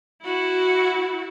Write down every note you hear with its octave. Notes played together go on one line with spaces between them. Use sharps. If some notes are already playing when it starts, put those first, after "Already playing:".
E4 F#4